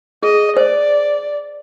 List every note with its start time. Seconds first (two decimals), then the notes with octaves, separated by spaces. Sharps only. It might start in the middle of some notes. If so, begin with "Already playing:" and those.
0.23 G#4 D#5
0.57 C5 D5